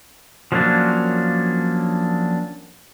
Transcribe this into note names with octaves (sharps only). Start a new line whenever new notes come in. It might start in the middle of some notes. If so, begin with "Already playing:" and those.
F3 F#3 A#3 C#4 D4